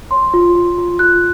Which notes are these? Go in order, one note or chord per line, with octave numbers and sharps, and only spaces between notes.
C#5 C6
F4
F4
F4
F4 F#6